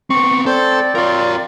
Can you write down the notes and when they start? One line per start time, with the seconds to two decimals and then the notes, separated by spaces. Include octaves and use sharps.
0.10 B3 C4 C#6
0.46 C4 A4 C5 D5
0.95 F4 A#4 C#5